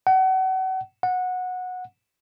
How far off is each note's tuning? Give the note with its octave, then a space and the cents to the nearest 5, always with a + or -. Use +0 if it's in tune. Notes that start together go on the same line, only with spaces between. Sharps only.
F#5 +35
F#5 -15